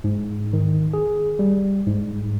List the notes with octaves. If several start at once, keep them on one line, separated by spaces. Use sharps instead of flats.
G#2
D#3
G#4
G3
G#2